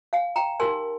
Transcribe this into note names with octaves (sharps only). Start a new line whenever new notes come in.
F5 G#5
G5 A#5
D#4 G4 A#4 G#5 C6